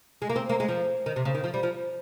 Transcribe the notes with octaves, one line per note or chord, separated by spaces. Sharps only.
G#3
A#3
C4
A#3
G#3
F3
D#3
C3
C#3
D#3
F3
G3
F3